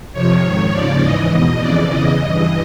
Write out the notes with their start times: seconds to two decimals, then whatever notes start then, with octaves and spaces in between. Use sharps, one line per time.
0.13 F2 C3 F3 C#5
0.42 G#2 D#3
0.70 D#2 C#3 F3 D5
1.01 G#2 E3 D#5
1.31 E2 B2
1.59 F2 C#3 E3 D5
1.89 E2 C#3 E3 D#5
2.19 G2 E3